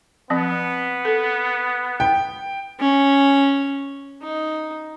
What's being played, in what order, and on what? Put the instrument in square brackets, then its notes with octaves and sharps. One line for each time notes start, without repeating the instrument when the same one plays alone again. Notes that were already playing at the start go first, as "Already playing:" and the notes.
[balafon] F3 C4 [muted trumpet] B3
[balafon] A4
[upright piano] G5
[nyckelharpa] C#4
D#4